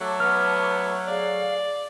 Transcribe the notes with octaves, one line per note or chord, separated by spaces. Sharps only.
F#3 A3 C#5 A5 D6
B3 F6
G#4 D5 F5